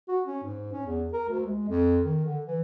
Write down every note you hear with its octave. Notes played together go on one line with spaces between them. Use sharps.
F#4
C#4
G#2
C#4
E2
A#4
D2
G#3
F2
D#3
D3
E3